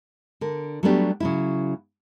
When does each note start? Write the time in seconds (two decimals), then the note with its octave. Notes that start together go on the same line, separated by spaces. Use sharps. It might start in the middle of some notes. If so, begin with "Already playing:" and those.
0.41 D3 A#4
0.83 F#3 G3 A3 B3 D4 G4
1.20 C#3 F#3 E4